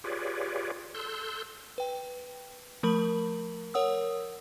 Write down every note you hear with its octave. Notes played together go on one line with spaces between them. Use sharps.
F4 G4 G#4 B4 C#5 D5
A4 C6 E6 F#6 G6
B4 G5
F3 A3 A#4 B5 F#7
A#4 C#5 F#5 D#6 E6